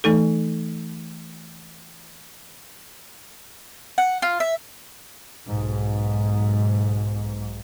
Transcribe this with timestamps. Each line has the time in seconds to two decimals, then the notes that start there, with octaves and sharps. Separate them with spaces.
0.04 E3 A3 D#4 A4
3.98 F#5
4.22 F4
4.40 E5
5.47 B1 G#2